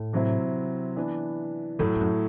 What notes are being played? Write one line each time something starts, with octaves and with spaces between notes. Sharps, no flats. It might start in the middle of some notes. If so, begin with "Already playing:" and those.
Already playing: A2
C3 F#3 C4 E4
E3 B3 D4
F#2 A2 F#3 A3
G2
F#2